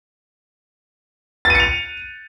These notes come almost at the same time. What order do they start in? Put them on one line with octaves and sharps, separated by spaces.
A6 D#7 C#7 F7